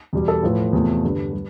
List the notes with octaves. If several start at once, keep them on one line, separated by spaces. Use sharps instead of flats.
E2 B2 G3
A4
A2 F3 A3 B4
E2 C3 F3 A3
G2 D3 G3 B4
G3